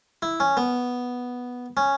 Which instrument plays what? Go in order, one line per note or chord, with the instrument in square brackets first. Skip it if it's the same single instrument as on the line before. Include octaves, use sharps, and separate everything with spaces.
[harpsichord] E4
C#4
B3
C#4